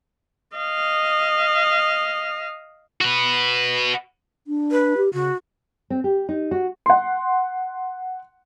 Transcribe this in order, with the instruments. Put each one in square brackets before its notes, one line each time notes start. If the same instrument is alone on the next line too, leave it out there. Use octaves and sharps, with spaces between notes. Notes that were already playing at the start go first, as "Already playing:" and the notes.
[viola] D#5 F5
[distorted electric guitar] F#4 B4
[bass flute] D4
[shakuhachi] B4
[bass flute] G4
[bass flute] C#3 [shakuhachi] F#4
[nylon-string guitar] C4
G4
D#4
F#4
[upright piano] F#5 C6